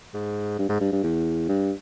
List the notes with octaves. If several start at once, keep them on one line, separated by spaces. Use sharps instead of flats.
G#2
G2
G#2
G2
G2
E2
G2